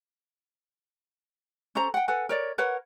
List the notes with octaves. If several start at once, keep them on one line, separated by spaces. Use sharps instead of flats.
C#4 A4 C5 A#5
F#5 G5
A4 B4 F#5 G#5
A#4 C#5 D5
A#4 B4 C#5 F#5